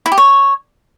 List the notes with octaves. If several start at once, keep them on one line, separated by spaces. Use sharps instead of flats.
E4
G4
C#5